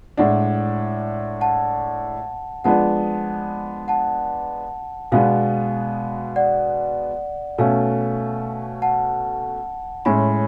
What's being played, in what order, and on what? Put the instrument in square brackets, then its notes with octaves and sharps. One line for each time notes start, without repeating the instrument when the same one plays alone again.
[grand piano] A2 G#3 D4 [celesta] D5 F#5
[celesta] F#5 A5
[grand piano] F3 G#3 B3 D4 [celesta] F#5 A5
[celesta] F#5 A5
[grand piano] B2 G#3 B3 D4 [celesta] F5 G#5
[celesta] D5 F#5
[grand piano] B2 A3 C#4 [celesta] F5 G#5
[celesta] F#5 A5
[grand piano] A2 G#3 C#4 [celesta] G#5 B5